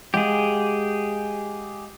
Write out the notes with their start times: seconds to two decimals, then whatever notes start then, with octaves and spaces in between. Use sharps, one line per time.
0.14 G#3 G4 G#4 F5 F#5